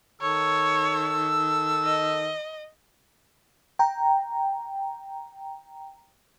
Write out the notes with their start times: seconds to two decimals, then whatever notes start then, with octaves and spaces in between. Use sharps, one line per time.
0.21 D#3 A4 C#5 E6
1.83 D#5
3.79 G5 A#5